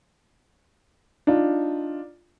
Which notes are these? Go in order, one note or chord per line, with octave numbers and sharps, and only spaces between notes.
D4 D#4 F4